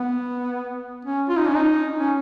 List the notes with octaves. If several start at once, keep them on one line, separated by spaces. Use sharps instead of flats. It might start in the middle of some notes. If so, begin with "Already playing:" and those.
Already playing: B3
C#4
F4
D#4
C#4
D#4
C#4